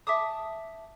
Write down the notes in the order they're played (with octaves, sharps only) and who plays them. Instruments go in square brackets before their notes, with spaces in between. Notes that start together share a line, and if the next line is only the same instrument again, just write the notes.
[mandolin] E5 A5 D6 D#6